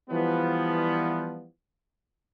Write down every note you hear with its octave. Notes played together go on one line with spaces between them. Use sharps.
E3 F3 G3 B3